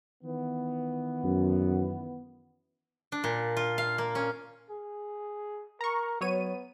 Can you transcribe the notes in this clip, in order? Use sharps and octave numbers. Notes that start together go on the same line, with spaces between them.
D#3 E3 B3
F#2
D4
A#2
F4
F5
A#3
C#4
G#4
A#4 A#5 C#6
F#3 B3 C#5 D#7